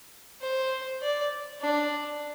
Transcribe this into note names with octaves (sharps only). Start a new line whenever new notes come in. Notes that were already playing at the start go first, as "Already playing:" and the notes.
C5
D5
D4